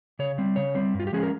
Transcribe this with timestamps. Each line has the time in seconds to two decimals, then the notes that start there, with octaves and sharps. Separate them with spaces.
0.19 C#3 C#5
0.38 G3 C4
0.56 C#3 C#5
0.75 G3 C4
0.94 G2
1.00 F4
1.07 G4
1.13 F3 G#3 C#4 G#4
1.23 A#4